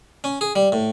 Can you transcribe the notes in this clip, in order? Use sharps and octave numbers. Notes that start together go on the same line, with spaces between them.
C#4
G#4
G3
A2